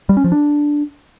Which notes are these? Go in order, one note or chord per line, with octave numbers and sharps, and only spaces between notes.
G3
C#4
F3
D4